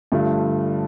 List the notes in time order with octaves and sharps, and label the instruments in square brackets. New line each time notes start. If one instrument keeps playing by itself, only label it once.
[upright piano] G2 D3 F3 A3